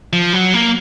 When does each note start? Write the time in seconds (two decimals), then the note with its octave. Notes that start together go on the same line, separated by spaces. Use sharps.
0.13 F3
0.33 F#3
0.54 A#3